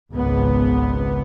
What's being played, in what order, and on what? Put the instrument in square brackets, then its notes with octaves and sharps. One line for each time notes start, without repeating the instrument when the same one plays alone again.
[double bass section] G#1 C#2 B3